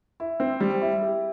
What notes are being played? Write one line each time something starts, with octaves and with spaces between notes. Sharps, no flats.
E4
C4
G3
E4
G4